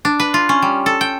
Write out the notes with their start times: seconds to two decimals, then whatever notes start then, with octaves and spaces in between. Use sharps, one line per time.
0.05 D4
0.20 B4
0.34 F4
0.49 C#4
0.62 G3
0.86 A4
1.01 G5